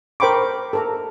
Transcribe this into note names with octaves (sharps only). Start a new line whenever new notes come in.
A#4 C5 G5 B5 C#6 D6
A4 A#4 A#5